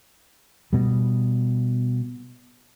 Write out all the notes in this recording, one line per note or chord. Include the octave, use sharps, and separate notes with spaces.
B2 G3